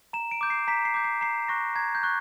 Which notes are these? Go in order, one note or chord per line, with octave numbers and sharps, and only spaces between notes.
A#5 E7
D7
D6 G6
C7
A#5 B6
C7
D6 G6
C7
A#5 C7
C#6 F#6 A#6
A#5 G#6
G6
C#6 F#6